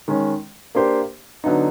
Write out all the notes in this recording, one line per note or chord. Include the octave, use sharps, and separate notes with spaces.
D#3 G#3 C#4
A#3 D4 G4 C5
D3 F#3 B3 D#4